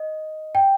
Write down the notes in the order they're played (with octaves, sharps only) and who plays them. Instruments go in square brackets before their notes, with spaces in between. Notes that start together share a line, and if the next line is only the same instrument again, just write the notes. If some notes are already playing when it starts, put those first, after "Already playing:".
Already playing: [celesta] D#5
G5